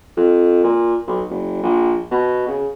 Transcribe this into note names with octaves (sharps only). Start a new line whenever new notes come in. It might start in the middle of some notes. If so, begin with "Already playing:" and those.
F2
A#2
B1
F#1
A#1
B2
C#3